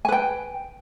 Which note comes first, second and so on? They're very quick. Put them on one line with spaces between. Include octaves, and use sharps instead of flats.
G#5 B4 G5